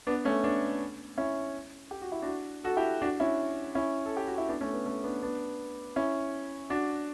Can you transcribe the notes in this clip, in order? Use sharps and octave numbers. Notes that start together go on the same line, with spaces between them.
B3 D4
A3 C#4
B3 D4
C#4 E4
G4
F#4
E4
D4 F#4
F#4 A4
E4 G4
D4 F#4
C#4 E4
C#4 E4
A4
G4
F#4
E4
B3 D4
A3 C#4
B3
A3 C#4
B3 D4
B3 D4
C#4 E4
D4 F#4